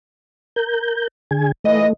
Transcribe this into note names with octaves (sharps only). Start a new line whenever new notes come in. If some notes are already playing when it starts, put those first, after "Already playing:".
A#4 G6
D3 G#4 G#5
A#2 E3 A3 D#5